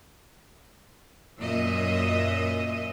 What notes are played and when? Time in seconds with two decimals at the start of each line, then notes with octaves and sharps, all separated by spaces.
1.40 F#2 A#2 D#5 E5